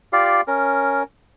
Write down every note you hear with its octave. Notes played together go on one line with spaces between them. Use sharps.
F4 G4 D5 F5
C#4 A#4